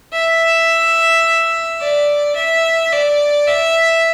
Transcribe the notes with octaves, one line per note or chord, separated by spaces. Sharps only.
E5
D5
E5
D5
E5